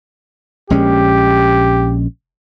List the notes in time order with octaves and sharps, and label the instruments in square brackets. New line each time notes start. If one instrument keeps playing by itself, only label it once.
[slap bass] A#1 G#3 C#4 [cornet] G4